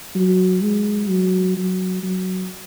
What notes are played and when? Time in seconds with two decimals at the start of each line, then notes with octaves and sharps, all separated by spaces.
0.15 F#3
0.62 G#3
1.09 F#3
1.57 F#3
2.03 F#3